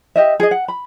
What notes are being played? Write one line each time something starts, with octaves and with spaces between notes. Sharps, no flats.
G4 D#5 E5
G#4 D#5
F#5
B5